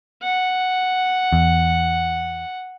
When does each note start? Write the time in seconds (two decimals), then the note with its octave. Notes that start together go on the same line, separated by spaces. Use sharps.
0.23 F#5
1.32 E2